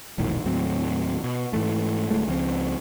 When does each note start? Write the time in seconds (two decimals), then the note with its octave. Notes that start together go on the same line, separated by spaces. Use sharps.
0.18 E1 A#1 A2 D#3
0.45 D#2 A2 F#3 C4
1.24 B2
1.53 G#2 E3 A3
2.10 D1 A2 G#3 A3
2.27 C#2 F3 G#3 C4